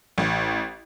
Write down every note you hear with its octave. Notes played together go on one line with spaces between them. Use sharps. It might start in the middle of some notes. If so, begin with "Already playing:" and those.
A1